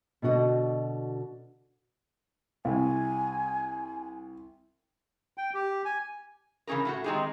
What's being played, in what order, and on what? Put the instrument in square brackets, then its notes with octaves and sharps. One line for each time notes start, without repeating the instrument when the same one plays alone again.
[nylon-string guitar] B2 D3 F#4 D#5
[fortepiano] C2 [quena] G#5
[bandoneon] G5
G4
G#5
[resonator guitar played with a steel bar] C#3 E3 C#4 G#4 A#4
A2 A3 F#4
D#3 G#3 C4 D#4 G4 G#4